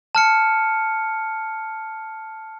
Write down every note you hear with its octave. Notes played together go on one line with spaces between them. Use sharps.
A5 F6 C#7